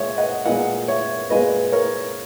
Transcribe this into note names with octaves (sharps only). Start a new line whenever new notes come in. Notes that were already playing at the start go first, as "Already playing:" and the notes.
Already playing: A#2 G#3 C#5 E5
D#5 F#5
A#2 G#3 B3 D#5 F#5
C#5 E5
A#2 G#3 B3 B4 D#5
A#4 C#5